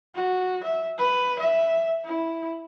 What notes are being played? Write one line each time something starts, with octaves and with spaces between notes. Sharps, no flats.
F#4
E5
B4
E5
E4